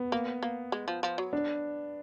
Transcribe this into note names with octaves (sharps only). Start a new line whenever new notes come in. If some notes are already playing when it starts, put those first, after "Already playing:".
Already playing: B3
A#3
A#3
G#3
F3
F3
F#3
D4